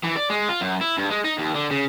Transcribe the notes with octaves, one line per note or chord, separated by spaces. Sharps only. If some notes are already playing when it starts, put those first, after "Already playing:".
E3
D5
G#3
F4
F#2
E4
G2
G#3
D#4
D#2
D3
C#3